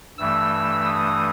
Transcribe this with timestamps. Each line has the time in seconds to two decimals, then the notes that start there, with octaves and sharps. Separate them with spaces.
0.18 G2 E3 A3 E6
0.86 D#6